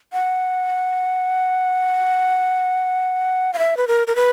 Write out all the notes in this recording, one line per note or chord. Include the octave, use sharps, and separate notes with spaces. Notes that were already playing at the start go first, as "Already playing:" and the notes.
F#5
F5
E5
B4
A#4
A#4
B4